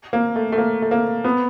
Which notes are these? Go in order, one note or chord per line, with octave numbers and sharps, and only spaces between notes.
A#3
A3
A3
A#3
A3
A#3
B3